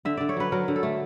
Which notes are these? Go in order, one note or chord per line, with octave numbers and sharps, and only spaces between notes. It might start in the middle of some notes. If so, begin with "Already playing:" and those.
D3 E5
D3 D5
C#5
F#3 B4
F#3 A#4
D3
A4
A3